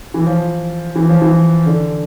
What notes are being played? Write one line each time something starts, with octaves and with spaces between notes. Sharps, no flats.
E3
F3
E3
F3
E3
D3